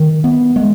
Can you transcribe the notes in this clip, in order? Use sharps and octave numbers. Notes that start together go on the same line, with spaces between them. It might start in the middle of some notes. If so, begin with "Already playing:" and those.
Already playing: D#3
B3
G#3